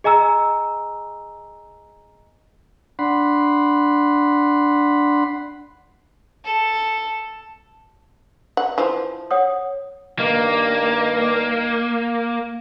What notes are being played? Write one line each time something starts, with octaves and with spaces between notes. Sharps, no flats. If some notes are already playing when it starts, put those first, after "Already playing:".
G#4 D#5 G#5 A#5 E6
D4 F#5 B5 C6
A4
F#5
E3 F3
C#5 F#5 D#6
G2 D#3 A#3